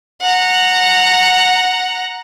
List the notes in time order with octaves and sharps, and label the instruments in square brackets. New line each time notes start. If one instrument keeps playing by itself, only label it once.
[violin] F#5 A#5